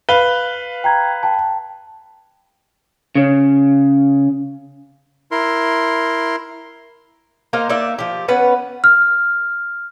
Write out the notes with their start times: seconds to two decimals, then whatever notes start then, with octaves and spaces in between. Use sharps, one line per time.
0.09 B4 F5 G7
0.84 G5 A#5 G#6
1.23 G5 A5
3.15 C#3
5.31 E4 A#4 C6
7.53 A#3 D#4 C5 F5
7.69 A#3 D#4 D5 E5
7.99 F3 G4
8.28 B3 C#4 B4 F#5
8.84 F6